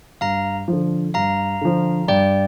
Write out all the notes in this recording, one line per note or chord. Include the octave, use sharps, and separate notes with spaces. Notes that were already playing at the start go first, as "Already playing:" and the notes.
G2 F5 A#5
D3 F3
G2 F5 A#5
D3 F3
G2 D5 G5